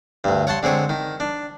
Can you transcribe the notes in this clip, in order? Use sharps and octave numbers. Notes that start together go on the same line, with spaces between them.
D2 G2
C#5 F#5 A5 C6
D3 G#3 C4 C#5
D#3
D4